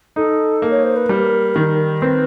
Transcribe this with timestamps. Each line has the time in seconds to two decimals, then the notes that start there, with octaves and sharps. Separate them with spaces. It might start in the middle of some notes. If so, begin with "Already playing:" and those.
0.16 D#4 A4
0.62 A#3
0.70 C#5
0.84 C5
0.96 B4
1.09 G3 A#4
1.56 D#3
2.01 C4 B4